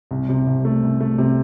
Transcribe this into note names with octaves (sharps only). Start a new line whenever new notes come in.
C2
C3
C2
A3
C2
A3
C3